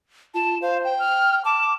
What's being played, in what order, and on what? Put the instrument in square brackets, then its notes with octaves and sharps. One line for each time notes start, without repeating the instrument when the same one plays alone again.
[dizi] F4 [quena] A5
[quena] C5 [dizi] F5
[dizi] G5
[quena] F6
[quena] A5 [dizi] D6